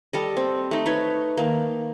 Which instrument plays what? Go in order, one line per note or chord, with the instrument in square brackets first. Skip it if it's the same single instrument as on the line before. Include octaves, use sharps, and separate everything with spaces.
[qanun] G3 A4 D#5
C4
A3 D#4
D#4 B4 C#5
D#3 A#3